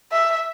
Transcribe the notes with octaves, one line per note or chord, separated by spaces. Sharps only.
E5